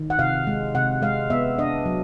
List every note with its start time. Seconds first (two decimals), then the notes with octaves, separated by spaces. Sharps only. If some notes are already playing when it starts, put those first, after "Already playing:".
Already playing: D#3
0.10 F#5
0.19 C3 F5
0.47 G#3
0.75 C3 F#5
1.02 G#3 F5
1.30 B3 E5
1.58 D4 D#5
1.86 F#3